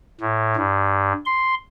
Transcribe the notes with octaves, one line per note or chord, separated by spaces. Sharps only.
A2
G2
C6